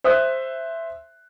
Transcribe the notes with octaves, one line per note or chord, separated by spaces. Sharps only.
C5 E5 D#6 F#6